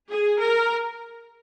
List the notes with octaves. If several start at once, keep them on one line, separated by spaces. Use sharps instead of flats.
G#4
A#4